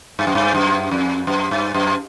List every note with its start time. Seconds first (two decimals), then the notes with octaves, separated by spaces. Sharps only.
0.19 G2
0.27 F#2
0.35 G2
0.55 F#2
0.91 F2
1.27 F#2
1.51 G2
1.74 F#2